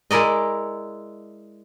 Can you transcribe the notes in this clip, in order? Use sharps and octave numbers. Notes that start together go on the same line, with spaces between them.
G#3 E4 A#4 D5 D#5